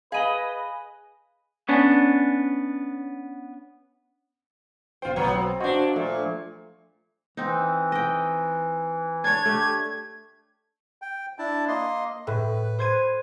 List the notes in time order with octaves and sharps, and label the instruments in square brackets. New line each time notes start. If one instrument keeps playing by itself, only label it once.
[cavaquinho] G#4 B5 [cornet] B4 [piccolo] D#5 [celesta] F5 D#7 F#7
[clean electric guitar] B3 C#4 D4
[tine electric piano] G1 G5 [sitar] F4 C5
[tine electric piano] B1 [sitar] A2 F#3 B3
[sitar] C4
[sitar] A#2 D4 [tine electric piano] F#4 C5 D#5
[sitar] A#2 [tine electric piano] F3 A3
[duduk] E3 [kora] C4 D#4
[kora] D#5 G5
[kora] D4 C#5 [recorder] G#6
[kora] A3 [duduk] G4
[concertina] G5
D4 E4 A5
A#3 D#5 C6
[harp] A2 [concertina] B4
[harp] C5 G#6 D#7